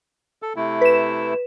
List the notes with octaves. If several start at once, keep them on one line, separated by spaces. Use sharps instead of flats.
A4
C3 A3 E4
B4 E7